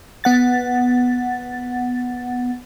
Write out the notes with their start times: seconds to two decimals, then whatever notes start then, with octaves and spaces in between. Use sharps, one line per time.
0.24 B3 F#5 A6